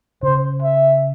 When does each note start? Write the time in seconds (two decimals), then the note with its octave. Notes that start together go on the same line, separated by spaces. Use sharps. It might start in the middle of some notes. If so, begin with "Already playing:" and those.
0.23 C#3 C5
0.62 E5